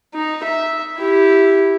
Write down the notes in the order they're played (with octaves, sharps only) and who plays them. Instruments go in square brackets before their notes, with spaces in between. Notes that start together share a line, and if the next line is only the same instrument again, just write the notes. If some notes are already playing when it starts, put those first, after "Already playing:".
[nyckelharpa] D#4
E5
E4 G4